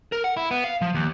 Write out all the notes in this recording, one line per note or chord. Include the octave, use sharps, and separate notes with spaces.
A#4
F#5
E4
B3
F5
F3
D#2